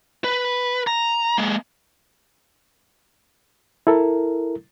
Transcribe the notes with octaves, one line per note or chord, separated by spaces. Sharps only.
B4
A#5
G#3 A#3
E4 A4 A#4